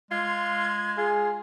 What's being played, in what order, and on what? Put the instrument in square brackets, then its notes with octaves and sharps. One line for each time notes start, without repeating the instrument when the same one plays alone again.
[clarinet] G#3 [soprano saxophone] F4 [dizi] G#6
[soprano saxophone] F4 [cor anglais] G#4